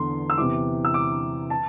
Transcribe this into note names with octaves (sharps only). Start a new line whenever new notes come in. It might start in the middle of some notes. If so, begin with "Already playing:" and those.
Already playing: E2 D3 C6
E6
E2 C3 E3 D6
E6
D6
A5